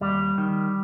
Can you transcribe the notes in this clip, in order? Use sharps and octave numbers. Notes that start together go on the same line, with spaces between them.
D#2 G3
D#3